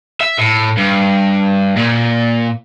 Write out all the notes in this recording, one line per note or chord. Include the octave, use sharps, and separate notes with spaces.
E5
A2
G2
A#2